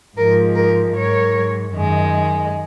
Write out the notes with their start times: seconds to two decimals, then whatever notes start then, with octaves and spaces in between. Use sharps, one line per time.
0.17 G#2 F3 G#3 A#4
0.55 A#4
0.93 G#2 F#3 A#4 C#5
1.71 F#2 D#3 G#3